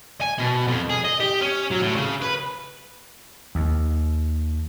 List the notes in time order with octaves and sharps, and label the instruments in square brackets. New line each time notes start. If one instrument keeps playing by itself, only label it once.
[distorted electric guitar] G#5
B2
F2
G#4
D#5
G4
C#4
F#3
A2
C#3
B4
[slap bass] D#2